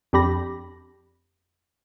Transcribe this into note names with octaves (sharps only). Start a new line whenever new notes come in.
F2 D4 G4 B5 A#6